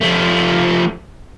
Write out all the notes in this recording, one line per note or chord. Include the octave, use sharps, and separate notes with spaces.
F3 A3